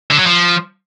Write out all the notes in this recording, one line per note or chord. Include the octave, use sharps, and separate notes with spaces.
D3
F#3
F3